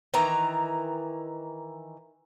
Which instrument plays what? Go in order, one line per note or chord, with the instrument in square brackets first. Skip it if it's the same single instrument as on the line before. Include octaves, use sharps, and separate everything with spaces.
[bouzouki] D#3 E3 A#5